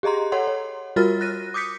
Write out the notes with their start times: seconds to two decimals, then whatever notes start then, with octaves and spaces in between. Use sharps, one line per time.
0.03 G4 G#4 D#5 A#5 C6
0.32 A4 C#5 F#5 C6
0.47 C#5
0.96 G3 F4 F#4 A#4 F6 A6
1.21 F#6 A#6 D#7
1.54 D6 D#6 G6 B6 C#7